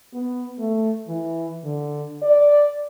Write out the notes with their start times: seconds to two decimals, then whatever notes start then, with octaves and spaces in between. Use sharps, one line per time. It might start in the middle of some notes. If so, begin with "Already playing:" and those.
0.14 B3
0.59 A3
1.08 E3
1.64 D3
2.22 D5